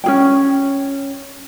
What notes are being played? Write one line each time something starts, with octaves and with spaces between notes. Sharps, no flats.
C#4 G#4 G5